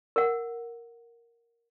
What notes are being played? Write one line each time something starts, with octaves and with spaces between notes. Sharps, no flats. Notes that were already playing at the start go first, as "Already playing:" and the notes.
A#4 F#5